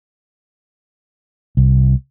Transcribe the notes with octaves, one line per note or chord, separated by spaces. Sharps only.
C2